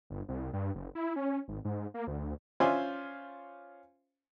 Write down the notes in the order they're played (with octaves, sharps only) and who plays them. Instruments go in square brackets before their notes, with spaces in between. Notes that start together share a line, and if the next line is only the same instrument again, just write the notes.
[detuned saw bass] G1
C2
G2
F#1
E4
C#4
G#1
G#2
A#3
D2
[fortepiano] C#4 F4 C5 D5 E5 G#5